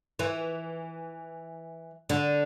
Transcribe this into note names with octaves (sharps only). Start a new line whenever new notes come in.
E3
D3